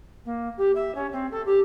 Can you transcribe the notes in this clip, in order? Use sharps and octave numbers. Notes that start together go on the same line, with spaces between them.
A#3
G4
E5
C#4
C4
A4
G4